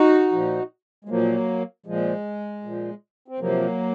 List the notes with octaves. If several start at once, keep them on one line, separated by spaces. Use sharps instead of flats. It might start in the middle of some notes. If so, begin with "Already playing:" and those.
Already playing: D#4 F#4
A#2 F3
G#3
A#2 F3 F#3 A#3
A#2 F3 G#3
A#2 F3
C4
C3 F3 F#3 A#3